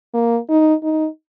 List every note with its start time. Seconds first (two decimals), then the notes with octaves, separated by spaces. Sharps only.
0.14 A#3
0.49 D#4
0.83 D#4